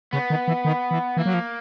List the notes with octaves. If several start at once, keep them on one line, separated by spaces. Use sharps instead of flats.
C#3 B3
D#3
E3
D#3
E3
E3 A#3
F#3
F3